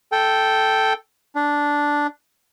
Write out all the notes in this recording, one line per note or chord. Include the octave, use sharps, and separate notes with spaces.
A4 G5
D4